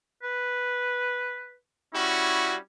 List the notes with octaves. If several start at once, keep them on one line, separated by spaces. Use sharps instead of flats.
B4
G3 C#4 E4 F#4